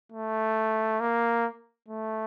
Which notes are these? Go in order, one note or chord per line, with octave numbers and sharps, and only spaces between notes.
A3
A#3
A3